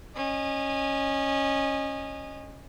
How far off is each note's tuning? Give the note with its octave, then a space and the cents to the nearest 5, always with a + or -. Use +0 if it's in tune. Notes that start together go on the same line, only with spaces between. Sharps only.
C#4 -15 D#5 -25